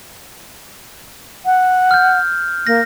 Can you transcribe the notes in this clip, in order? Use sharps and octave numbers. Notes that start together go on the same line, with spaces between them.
F#5
F6 G6
A#3 A#6